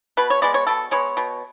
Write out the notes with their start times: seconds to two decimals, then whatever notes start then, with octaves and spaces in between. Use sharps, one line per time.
0.17 B2 B4
0.30 C#5
0.42 G#3 B3 D5
0.54 C#5
0.67 B2 A4
0.91 G#3 B3 C#5
1.17 B2